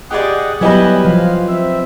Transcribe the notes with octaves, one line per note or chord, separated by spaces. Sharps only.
G4 G#4 D5 D#5 F#5
F#3 G3 B3 E4 G4 B4 D#5 G#5
F3 F5
C4 E5